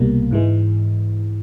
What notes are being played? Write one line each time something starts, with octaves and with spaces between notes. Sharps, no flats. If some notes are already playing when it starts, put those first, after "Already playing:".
Already playing: C2 B2 G3 A#3
G#2 E3 G#3